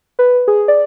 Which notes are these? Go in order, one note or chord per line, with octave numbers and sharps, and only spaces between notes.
B4
G#4
D5